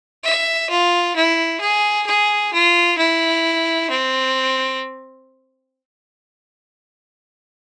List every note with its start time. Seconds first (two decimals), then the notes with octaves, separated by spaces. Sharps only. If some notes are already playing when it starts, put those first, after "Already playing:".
0.24 E5
0.70 F4
1.16 E4
1.61 G#4
2.07 G#4
2.54 F4
2.98 E4
3.90 C4